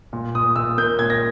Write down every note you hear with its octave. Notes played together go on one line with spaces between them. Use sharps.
A#2
A#2 D#6
A#2 E6
A#3 G6
A#2 G#6
A#6